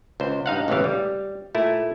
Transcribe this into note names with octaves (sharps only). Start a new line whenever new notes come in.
C#2 C5
G2 D#4 F5 F#5
A1 E2 G#2 C#3 E3 F5
G3
A#2 A3 E4